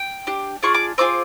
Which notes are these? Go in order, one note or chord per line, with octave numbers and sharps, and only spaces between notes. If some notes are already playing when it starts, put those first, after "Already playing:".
Already playing: G5
D4 G4
D4 F4 G#4 C#6
D6
C4 F4 G#4 D6